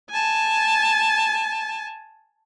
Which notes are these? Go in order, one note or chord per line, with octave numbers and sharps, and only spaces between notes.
G#5 A5